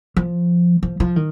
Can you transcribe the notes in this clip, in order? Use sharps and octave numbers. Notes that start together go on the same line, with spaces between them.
F3
F3
F3
D#3